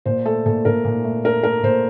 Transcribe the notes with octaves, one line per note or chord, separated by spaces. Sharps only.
A#2 C5
A3 A4
A#2 A4
A#2 A#4
A#2
A3
A3 A#4
A3 A#4
A#2 C5